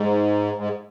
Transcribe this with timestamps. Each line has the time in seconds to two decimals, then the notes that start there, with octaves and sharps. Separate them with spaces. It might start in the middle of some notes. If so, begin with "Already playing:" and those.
Already playing: G#2
0.57 G#2